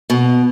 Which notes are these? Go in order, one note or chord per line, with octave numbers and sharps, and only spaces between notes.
B2